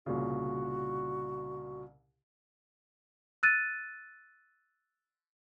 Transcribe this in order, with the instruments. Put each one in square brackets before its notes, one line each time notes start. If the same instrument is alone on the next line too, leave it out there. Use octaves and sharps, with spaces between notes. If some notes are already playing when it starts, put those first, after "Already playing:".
[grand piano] C2 A#2 C#3 [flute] F#4
[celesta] E6 F#6 A6 D#7